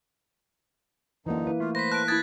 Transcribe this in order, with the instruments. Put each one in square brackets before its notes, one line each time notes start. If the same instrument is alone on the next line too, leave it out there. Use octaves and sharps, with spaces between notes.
[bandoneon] F#2 D3 D#4 [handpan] E3 A#3
[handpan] E4 [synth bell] B4
[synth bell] A3 A#3 [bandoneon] F4
[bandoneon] B4 C5 [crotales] A#6 B6
[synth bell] A5 B6 D7 [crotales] F#6
[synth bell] E4 A5 D#6 [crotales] G#6 A6